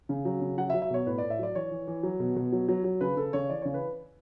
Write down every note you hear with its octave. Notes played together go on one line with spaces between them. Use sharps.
C#3
F#3
C#3
F#3 F#5
E5
F#3
E5
B2 C#5
A2 B4
A2 D5
E5
F#3 D5
E3 C#5
E3
E3
F#3
B2
B2
F#3
F#3
F#3
C#3 B4
C#3 A4
C#3 C#5
E3 D5
C#3 C#5
B4